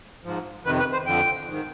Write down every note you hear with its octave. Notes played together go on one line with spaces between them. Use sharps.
G#2 F3
F2 C3 D#3 B4
B4
C5
F2 D3 F3 G5
G#2 D#3